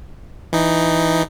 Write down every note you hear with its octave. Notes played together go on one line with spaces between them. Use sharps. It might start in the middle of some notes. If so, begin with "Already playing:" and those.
E3 D#4